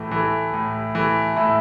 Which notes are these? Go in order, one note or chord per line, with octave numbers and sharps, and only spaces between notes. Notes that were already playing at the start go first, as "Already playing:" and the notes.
Already playing: A2 E3 A3
E3 A3
A2
E3 A3
A2 E4